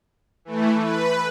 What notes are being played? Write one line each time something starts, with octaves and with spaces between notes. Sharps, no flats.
E3 A3
B4